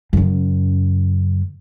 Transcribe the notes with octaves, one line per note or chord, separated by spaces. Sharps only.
F#2 C#3